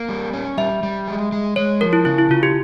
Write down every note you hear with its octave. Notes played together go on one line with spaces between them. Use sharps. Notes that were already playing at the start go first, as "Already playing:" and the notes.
Already playing: A#3
G3
C#4
G3 E5
G3
G#3
G#3
G#3 C#5
F3 A#4
E4
C#3 E4
E4
C#3 F4
G4